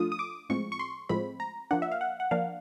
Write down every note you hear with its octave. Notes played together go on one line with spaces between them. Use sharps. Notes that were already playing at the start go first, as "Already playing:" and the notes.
Already playing: F3 A3 D4 F4 D#6
D#6
D6
A2 F3 G#3 C4 C#6
C#6
C6
A2 F3 G#3 C4 B5
A#5
F3 A#3 D4 F#5
E5
F5
F#5
F#5
F3 A#3 D4 F5